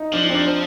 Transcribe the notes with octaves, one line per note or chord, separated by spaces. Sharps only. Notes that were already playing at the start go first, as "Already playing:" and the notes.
Already playing: D#4
F3 D4
D4
C4
D4
C4